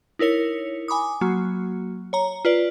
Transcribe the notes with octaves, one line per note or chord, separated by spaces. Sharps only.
D#4 E4 A#4 C#5 C#7
G#5 B5 D6 D#6
F#3 A#3 F#4
C#5 A#5
F4 B4 D5